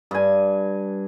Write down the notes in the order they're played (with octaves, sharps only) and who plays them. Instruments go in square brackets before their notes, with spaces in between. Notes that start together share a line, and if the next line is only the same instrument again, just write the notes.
[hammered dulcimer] G2 G#5